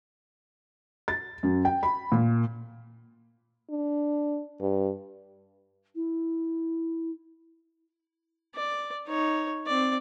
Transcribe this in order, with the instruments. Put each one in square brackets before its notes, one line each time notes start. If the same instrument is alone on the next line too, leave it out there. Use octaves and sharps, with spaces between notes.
[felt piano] A6
F#2
G5
B5
A#2
[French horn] D4
G2
[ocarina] E4
[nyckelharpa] D5
D#4 C#5
C4 D5